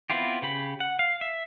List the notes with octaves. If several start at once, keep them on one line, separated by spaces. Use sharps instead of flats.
B3 C4 E4 F4 G4
C#3 G4 B5
F#5
F5
E5